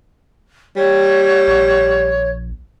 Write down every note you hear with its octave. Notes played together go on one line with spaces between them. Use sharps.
G3 C#5
A#1